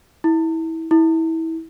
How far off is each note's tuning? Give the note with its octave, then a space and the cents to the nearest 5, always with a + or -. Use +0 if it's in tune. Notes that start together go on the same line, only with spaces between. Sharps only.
E4 -25
E4 -25